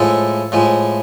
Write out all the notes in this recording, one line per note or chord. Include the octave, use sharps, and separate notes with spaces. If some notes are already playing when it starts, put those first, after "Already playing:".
Already playing: A2 F3 G#3 A4
A2 F3 G#3